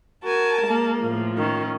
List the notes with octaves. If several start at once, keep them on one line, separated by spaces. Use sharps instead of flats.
F#4 A#4 G#5 A5
G#3 A#3
A2 F3
D#3 C#4